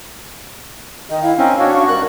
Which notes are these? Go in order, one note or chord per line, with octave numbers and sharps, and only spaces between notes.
D#3 D#5
E4 F5
C4 C#4 D#4
D4 F#4 C#5
C#6
G2 A#4 F#6